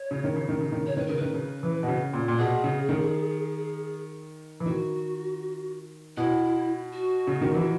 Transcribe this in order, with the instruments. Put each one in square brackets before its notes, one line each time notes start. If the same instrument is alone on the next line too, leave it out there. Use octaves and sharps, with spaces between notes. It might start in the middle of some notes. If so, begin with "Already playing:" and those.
Already playing: [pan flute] C#5
[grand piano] C#3
D#3
C#3
D#3
C#3
D#3
[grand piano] C#3 [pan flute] C#5
[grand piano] D#3 [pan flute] B4
[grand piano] C#3 [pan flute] A#4
[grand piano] D#3 [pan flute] B4
[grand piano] C#3
E3
B2
C#3
A#2
A#2
[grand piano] B2 [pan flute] G#4
[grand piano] C#3
D#3
E3
[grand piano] D#3 [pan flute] F#4
[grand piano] B2 [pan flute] E4
[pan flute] F#4
[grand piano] C#3
D#3
E3